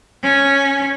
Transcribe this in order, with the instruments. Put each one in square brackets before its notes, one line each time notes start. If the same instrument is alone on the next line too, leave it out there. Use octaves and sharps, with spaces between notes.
[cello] C#4